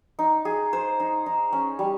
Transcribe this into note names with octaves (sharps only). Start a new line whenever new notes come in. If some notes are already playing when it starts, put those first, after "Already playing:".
D#4
G#4
C5
D#4
D#4
C#4
G3